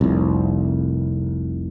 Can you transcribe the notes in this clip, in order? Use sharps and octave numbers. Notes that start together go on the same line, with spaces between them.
F1 C2